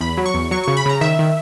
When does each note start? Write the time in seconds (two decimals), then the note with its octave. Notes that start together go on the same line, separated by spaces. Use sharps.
0.01 E2 B5
0.17 F#3
0.26 C#6
0.34 E2
0.51 F#3 C#6
0.64 C#3 C#6
0.77 B5
0.86 C#3 A#5
1.01 D#3 E5
1.19 D#3